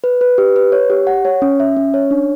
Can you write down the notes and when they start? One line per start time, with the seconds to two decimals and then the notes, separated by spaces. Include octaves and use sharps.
0.04 B4
0.21 B4
0.38 G4
0.56 B4
0.72 C#5
0.90 G4
1.07 F#5
1.25 C#5
1.42 C#4
1.60 E5
1.77 C#4
1.94 C#5
2.11 D4